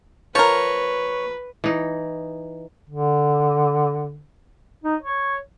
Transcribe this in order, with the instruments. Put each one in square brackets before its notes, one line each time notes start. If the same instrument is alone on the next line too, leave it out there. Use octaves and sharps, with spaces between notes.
[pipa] F3 A#4 [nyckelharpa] B4 [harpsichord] C#5
[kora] E3 D#4
[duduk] D3
D#4
C#5